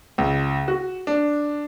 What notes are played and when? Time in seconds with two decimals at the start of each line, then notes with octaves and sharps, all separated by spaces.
0.18 C#2
0.68 F#4
1.07 D4